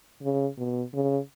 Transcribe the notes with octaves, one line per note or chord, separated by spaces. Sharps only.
C#3
B2
C#3